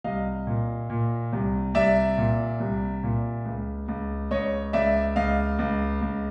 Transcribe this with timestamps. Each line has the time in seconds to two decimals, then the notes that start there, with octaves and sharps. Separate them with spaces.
0.04 C2 D#5 F5
0.47 A#2
0.90 A#2
1.33 C2
1.75 C2 D5 E5
2.18 A#2
2.60 C2
3.03 A#2
3.45 C#2
3.88 C#2
4.31 C#2 C#5 D#5
4.73 C#2 D5 E5
5.16 C#2 D#5 F5
5.59 C#2
6.01 C#2